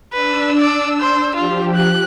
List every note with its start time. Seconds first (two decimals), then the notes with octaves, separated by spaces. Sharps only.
0.13 D4 B4 E6
0.59 D5
1.00 C5
1.36 F3 F4 G4
1.74 F#6